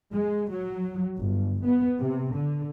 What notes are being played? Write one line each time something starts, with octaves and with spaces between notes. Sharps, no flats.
G#3
F#3
G1
B3
C3
D3